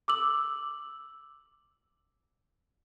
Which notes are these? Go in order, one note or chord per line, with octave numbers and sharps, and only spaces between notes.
D6 E6 F#7